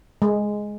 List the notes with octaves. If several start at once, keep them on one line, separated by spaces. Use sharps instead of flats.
G#3